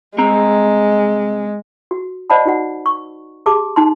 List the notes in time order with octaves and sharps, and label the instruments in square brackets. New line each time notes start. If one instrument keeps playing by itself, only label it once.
[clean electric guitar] C2 C4 A#5 [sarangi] G#3
[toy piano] F#4
C5 D5 D#5 F#5 A5 B5
D#4 F#4 F#5
C#6
G4 G#4 A5 D6
D#4 A5 C6